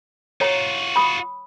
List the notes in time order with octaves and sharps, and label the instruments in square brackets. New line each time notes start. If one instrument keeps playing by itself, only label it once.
[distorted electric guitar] F4 F#4 [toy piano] C#5 A#5
[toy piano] B5 D#6